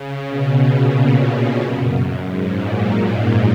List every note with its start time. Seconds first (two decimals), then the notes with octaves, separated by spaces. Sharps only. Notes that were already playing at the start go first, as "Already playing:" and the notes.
Already playing: C#3
0.26 B2
0.71 A#2
1.62 F#2
1.92 F#2
2.23 G#2
2.53 A#2
2.98 G#2